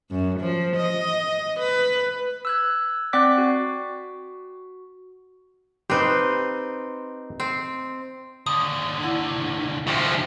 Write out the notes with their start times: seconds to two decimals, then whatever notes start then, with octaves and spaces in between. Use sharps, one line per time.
0.11 F#2
0.40 F3
0.76 D#5
1.59 B4
2.45 E6 F#6 G#6
3.13 C4 D5 F#5 D6 F#6 B6
3.38 F#4
5.90 C4 D#4 G4 B4 C5
7.40 C4
8.46 D#2 D3 D#6
9.03 E4 F#5 G#6
9.26 C3
9.87 D2 C#3 F3 G4